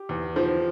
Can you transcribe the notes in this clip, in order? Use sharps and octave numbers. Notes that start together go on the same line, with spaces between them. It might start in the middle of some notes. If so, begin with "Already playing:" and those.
Already playing: G4
E2
F3